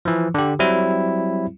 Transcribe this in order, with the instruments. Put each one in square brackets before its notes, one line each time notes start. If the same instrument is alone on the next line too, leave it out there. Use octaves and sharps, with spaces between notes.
[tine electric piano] E3 F3
D3 G4
F#3 G3 C4 E4